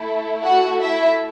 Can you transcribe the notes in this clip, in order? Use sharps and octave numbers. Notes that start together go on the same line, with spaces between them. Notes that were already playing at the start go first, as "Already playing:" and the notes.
Already playing: A3 E4 A4
F#4 F#5
E4 E5